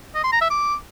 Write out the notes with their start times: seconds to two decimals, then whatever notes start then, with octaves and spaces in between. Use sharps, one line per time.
0.15 D#5
0.24 C6
0.32 A#5
0.41 E5
0.50 D6